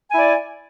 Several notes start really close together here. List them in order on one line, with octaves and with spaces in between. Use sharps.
G#5 E4 D5